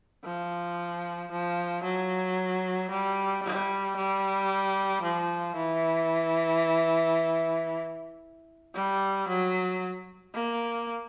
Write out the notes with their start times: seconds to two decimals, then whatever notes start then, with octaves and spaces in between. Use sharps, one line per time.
0.25 F3
1.32 F3
1.84 F#3
2.91 G3
3.43 G3
3.96 G3
5.03 F3
5.56 E3
8.75 G3
9.28 F#3
10.35 A#3